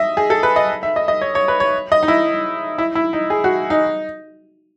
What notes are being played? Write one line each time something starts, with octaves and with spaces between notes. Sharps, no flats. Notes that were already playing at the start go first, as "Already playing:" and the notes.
Already playing: D#5 E5
G#4
A4
B4
D#5
E5
D#5
D#5
C#5
C#5
B4
C#5
D#5
D#4
E4
E4
E4
D#4
G#4
F#4
D#4